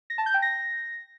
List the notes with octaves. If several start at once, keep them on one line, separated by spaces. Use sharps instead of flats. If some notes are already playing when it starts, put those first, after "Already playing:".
A#6
A5
G6
G5
A#6